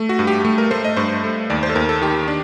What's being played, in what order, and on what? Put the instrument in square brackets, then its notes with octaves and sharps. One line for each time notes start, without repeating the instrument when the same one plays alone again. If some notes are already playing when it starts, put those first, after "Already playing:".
Already playing: [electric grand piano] A3
F#4
G2
G4
A3
A#4
A3 C5
D#5
G2 C5
A3
D#2 D5
C5
A4
D#2 A#4
A4
D#3 G4
D4